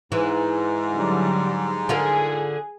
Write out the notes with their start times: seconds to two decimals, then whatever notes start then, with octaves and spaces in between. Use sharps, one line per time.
0.12 G#2 E3
0.91 D3 F#3 G3
1.89 D3 F4 G#4 A#4